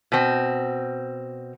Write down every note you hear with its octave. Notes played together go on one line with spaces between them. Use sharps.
B2 C4